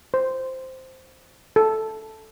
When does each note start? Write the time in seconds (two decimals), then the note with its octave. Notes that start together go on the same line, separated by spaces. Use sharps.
0.14 C5
1.56 A4